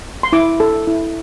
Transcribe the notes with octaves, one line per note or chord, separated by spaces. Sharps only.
C6
E4 D6
A4
E4